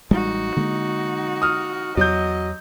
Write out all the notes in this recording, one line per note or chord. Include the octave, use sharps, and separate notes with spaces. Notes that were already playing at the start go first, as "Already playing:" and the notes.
A1 G3 G#3 D#4 F#4
D3 G#3 A#3
D#6 F6
E2 F#3 D#5 G6